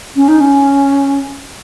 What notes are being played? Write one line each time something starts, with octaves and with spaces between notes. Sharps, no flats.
C#4
D#4
C#4